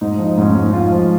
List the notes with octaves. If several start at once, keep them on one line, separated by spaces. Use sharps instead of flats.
G#2 D#4
F3
D#4
G#2 C#4
D#4
G#2
G#2 F4
F3